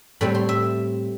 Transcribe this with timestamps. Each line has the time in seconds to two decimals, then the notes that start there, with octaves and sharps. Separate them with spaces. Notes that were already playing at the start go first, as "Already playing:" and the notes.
0.21 A2 G3 C4 B5
0.35 C6
0.49 E5